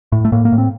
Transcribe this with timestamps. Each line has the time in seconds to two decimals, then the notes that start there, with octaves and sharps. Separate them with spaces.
0.12 A2
0.25 A3
0.32 A2 A#3
0.45 A#3
0.52 A2
0.58 C4